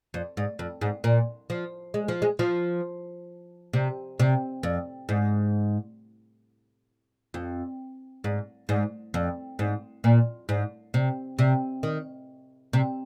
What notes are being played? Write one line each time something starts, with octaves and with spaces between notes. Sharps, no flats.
F2
G#2
F2
G#2
A#2
F3
G#3
F3
G#3
F3
C3
C3
F2
G#2
F2
G#2
G#2
F2
G#2
A#2
G#2
C3
C3
D#3
C3